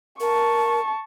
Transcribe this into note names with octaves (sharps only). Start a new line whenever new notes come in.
A#4 A5 C#6